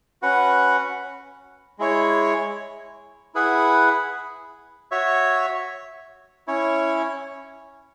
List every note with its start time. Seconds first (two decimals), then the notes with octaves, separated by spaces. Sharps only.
0.22 C#4 F#4 B4 F#5
1.79 G#3 E4 C#5
3.35 E4 G#4 B4 F#5
4.91 F#4 C#5 E5
6.47 C#4 E4 C#5